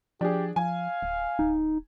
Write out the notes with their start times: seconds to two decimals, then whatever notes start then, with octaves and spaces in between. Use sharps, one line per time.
0.21 F3 D4 G4 G#4
0.56 F3 F5 G#5
1.02 D1
1.39 D1 D#4